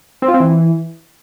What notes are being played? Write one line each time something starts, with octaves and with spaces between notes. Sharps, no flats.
C4
F4
C4
E3